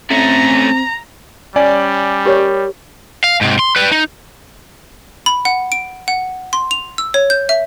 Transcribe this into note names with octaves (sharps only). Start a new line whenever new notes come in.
A3 C4 C#4 A#5
G3 C#4 D5 G#5
G4 A#4 C#5
F5
G#2 C3
C6
G3 B4
D#4
B5
F#5
D7
F#5
C6
F7
E6
C#5
G6
E5